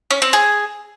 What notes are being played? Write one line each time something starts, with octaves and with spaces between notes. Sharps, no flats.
C#4
C4
G#4